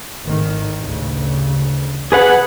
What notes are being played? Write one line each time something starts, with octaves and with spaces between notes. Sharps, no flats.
G#1 A2 D#3
A1 D2 C#3
G#4 B4 F#5